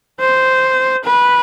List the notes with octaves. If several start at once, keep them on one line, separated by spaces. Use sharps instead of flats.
C5
B4